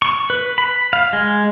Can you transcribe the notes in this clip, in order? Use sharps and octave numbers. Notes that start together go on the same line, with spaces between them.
C#6
B4
B5
F5
G#3